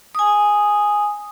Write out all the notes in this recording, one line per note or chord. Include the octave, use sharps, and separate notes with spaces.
G#5 D#6